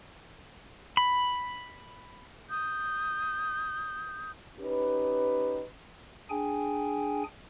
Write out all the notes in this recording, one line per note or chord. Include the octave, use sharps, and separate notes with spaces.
B5
D#6 G6
C#4 D#4 G4 B4
D4 G#4 G5 G#5